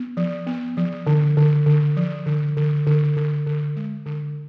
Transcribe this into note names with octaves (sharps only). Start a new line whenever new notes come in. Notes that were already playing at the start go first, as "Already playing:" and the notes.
Already playing: B3
F3
B3
F3
D3
D3
D3
F3
D3
D3
D3
D3
D3
G#3
D3